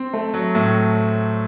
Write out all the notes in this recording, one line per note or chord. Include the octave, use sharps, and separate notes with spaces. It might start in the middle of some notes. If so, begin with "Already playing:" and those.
Already playing: C4
A3
F#3
A2